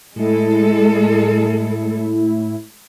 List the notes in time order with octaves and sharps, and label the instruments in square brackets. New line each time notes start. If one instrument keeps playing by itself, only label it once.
[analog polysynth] A2 E4 [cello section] G#3 A4